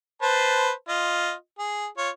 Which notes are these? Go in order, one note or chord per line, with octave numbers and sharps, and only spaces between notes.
B4 C5 A5
F4 D#5
G#4
F4 C#5